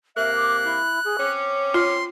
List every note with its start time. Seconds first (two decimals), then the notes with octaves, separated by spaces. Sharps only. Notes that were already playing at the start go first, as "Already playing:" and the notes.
0.16 C3 A#3 E5 F#6
0.35 D6
0.64 E4
1.04 G#4
1.19 C4 C#4 D6
1.74 F4 C6